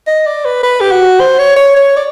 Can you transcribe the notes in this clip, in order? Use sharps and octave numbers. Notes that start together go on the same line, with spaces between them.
D#5
D5
B4
B4
G4
F#4
C5
C#5
C#5
C#5
D5